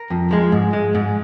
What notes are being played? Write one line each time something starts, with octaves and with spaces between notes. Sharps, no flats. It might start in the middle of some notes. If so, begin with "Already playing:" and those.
Already playing: A#4
F2
F3 G#3
G#2
G#3
G#2